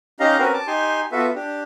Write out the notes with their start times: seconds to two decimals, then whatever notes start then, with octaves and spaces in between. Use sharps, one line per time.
0.20 C#4 D#4 G4 D#5 F5 A#5
0.39 C4 C#4 F#4 A#4 B4
0.54 A5 D6
0.67 D#4 G4 G#5 C6
1.12 B3 F4 F#4 A4 B4 E5
1.35 D4 G4